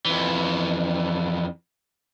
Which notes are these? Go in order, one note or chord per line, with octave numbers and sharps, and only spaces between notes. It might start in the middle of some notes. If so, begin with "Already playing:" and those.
F2 E3